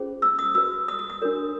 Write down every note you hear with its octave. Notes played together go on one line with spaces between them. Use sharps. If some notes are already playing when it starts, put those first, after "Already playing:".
Already playing: C#4 F4 G#4 C5
E6
D#6
F#4 B4 E6
D#6
D#6
D#6
D4 F#4 A#4 C#5